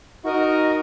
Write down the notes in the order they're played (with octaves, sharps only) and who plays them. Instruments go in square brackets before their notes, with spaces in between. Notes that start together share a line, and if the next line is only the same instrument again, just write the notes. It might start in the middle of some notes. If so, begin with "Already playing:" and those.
[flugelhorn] D#4 [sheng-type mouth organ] F#4 A#4 D#5